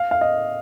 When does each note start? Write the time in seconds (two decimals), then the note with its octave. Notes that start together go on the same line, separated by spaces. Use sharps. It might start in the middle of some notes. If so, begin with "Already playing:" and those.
Already playing: F5
0.11 F5
0.21 D#5